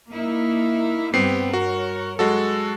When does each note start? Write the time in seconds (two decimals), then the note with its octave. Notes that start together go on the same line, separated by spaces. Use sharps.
0.13 A#3 D#4 E4
1.14 G2 B3 C4 G4 C7
1.53 F#4 A#4 C#5
2.19 F#3 G#3 F#4 A4